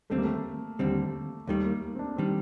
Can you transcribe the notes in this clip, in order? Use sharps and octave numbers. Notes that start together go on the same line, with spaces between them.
D#2 D3 G3 A3 C4
A#3
A3
D#2 D3 G3 C4
D#2 D#3 G3 A3
A#3
C4
D4
D#3 G3 C4